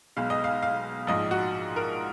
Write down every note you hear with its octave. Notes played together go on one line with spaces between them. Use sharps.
B1 B2 G#3 F5
D#5
F5
F5
A#1 G#2 F3 D#5
F#4
A#4